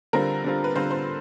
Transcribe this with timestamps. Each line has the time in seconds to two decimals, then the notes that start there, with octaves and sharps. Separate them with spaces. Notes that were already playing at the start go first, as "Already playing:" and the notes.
0.13 D3 G3 C4 F4 A#4
0.44 D3 G3 C4 F4
0.64 B4
0.75 D3 G3 C4 F4 C5
0.91 C5